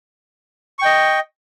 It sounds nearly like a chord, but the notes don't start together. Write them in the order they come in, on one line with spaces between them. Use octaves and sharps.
C#6 G5 D#5